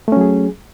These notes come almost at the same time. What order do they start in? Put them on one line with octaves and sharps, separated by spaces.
A3 C#4 F#3 G#4